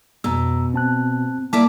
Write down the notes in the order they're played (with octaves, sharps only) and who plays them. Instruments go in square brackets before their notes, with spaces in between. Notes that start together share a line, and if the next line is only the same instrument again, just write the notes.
[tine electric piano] F2 A#5 E6 [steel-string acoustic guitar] B2
[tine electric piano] C4 A5 F#6
[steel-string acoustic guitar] A#3 E4 D5 [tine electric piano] A5 D6 B6